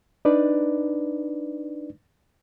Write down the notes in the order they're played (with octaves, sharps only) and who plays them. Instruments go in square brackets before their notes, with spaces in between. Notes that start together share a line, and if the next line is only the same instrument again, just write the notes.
[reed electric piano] D4 D#4 B4 D5